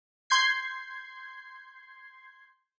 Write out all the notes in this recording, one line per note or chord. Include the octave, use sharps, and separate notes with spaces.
C6 G6 G#6 C7